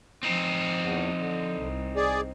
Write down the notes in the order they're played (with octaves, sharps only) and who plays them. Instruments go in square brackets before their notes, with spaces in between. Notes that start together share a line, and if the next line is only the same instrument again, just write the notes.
[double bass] F3 [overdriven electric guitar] C4 D#4
[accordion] E2
D3
[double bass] C2
[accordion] G#4 D5